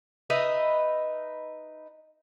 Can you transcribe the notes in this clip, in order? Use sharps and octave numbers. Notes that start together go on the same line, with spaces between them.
D#4 B4 D#5 E5